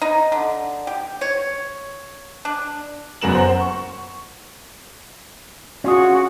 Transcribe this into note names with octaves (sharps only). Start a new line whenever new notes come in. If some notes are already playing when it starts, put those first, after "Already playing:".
D#4
D3
G4
C#5
D4
F#1 F#2 B3 A#4 E7 F#7
C5 F#5
C#6
C#4 F4 F#4 G#4